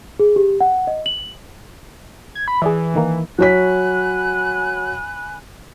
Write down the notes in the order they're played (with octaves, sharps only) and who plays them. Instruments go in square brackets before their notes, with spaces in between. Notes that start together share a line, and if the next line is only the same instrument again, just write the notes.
[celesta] G#4
G4
F#5
D#5
F#7
[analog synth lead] G#6
B5
[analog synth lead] E3 [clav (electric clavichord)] G#4 D5 E5
[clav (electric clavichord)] D#3 A#3
[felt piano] F#3 C#5 B6 [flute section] G#5 B5 F#6